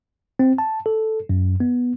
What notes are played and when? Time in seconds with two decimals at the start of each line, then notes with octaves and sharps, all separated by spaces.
0.39 C4
0.58 A5
0.86 A4
1.29 F#2
1.60 B3